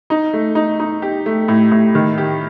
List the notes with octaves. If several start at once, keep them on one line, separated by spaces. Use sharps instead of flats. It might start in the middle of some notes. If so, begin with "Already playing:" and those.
D#4
A3
D#4
D#4
G4
A3
A2
A2
D#3
G4